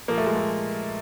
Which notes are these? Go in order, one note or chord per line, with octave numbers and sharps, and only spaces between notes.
A#2 F3 A#3
A3
G#3
A3